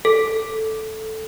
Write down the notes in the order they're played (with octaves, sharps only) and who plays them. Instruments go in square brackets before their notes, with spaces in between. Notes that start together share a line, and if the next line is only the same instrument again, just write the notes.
[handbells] A4